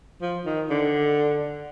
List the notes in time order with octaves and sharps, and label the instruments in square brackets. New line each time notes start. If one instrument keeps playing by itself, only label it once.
[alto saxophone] F3
D#3
D3